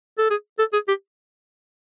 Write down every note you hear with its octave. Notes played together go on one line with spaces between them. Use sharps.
A4
G#4
A4
G#4
G4